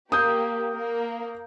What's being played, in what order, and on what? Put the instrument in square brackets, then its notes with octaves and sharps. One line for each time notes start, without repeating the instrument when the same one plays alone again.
[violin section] A#3 G4 [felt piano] D#6 G6
[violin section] A#3 A#4